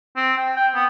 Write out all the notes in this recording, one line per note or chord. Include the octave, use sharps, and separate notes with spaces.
C4
G5
G5
B3